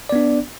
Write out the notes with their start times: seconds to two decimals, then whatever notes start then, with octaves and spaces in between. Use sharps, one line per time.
0.09 D5
0.12 B3
0.15 D4